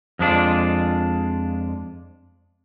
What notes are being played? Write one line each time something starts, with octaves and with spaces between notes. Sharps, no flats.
F2 G#3 D4 F4